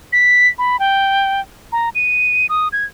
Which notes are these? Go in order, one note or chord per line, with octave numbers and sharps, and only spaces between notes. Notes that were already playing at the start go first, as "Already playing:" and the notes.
B6
B5
G5
A#5
D#7
D#6
G#6